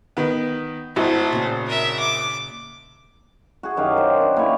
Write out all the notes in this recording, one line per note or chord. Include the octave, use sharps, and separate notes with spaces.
D#3 B3
G#1 A3 E4 F#4 C5 E5
A#2 C#3
A#4 E5
D6
F#4 G#4
F#2 D#3 G4 F5
C5
D4
A#2 E4 C#5